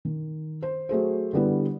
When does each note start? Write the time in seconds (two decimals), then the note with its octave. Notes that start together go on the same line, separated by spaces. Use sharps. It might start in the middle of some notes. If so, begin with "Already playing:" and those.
0.05 D#3
0.63 C5
0.89 F#3 A3 G#4 C5
1.33 D3 G3 B3 E4